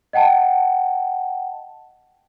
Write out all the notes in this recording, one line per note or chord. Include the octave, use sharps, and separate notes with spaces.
D#5 F#5 G5 A5